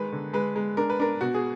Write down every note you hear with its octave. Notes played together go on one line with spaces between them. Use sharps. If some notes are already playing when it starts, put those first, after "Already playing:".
Already playing: D#3 G#3 B4
D3
G#3 B4
G#3
D4 A#4
B4
D4 A#4
B2 F#4
G#4